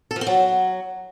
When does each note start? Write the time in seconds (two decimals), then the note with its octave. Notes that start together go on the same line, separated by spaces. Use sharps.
0.11 A4
0.16 F3
0.21 C4
0.27 F#3